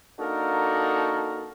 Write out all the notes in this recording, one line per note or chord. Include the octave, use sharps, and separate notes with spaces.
A#3 D4 D#4 F#4 A4 A#4